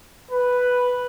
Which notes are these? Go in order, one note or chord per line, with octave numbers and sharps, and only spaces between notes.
B4